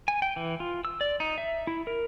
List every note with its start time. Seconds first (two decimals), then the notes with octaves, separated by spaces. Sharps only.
0.08 G#5
0.22 G5
0.36 E3
0.60 F4
0.85 E6
1.01 D5
1.20 D#4
1.38 E5
1.67 E4
1.87 A#4